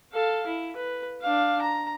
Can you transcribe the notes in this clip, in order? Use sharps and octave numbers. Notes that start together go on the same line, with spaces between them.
A4 F5
E4
B4
D4 F5
A#5